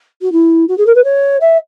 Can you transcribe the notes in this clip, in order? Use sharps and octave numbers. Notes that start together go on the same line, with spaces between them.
F#4
E4
F#4
G#4
A#4
B4
C#5
E5